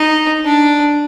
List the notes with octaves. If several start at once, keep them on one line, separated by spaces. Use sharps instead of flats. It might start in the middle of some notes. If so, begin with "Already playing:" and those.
Already playing: D#4
D4